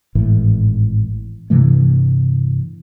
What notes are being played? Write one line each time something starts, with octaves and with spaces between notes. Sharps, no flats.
G#1 A2 E3
G2 C3 E3 A3